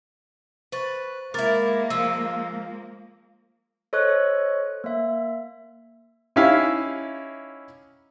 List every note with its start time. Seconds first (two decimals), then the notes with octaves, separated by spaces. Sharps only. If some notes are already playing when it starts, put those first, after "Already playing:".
0.72 B4 C5 C#6 A6
1.34 G#3 A#3 E4 A#4 D6 A6
1.90 F3 E6
3.93 A4 C5 C#5 D#5 C#6 F#6
4.84 A#3 E5
6.36 C#4 D#4 E4 G4 E5 F5